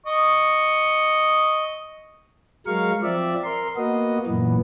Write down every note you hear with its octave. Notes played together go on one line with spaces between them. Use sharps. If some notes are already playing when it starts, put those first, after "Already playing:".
D#5 C#6
F#3 G#3 A#4 F5 C#6
F3 C4 D5 E5
A#4 C6
A#3 B3 F#4 D#5
F#2 A#2 E3 B3